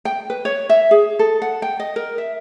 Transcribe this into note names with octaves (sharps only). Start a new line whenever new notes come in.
G5
B4
C#5
E5
G#4
A4
F#5
G5
D#5
A#4
E5